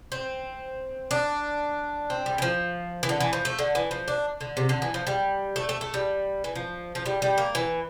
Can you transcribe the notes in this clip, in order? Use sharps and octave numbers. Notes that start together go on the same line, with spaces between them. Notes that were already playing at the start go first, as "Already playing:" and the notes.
C4
D4
C4
G3
E3
F3
E3
D3
E3
F3
A3
D3
E3
F3
D4
D3
C3
D3
E3
F3
G3
A3
A3
A3
G3
E3
F3
F3
G3
G3
A#3
E3